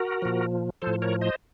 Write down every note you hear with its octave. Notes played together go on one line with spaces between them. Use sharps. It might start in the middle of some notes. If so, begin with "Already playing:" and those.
Already playing: F#4 A#4
A#2 F3
A2 F3 A4 C5
A#4 C#5
C5 D#5